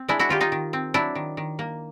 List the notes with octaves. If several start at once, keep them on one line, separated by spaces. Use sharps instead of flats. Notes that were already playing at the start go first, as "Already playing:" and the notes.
Already playing: C4
G#3 D4 E4
E4 F#4
D#3 F4 G4
D#4 F4
D#3
C4
F#3 D4 E4
D#3
D#3
A#3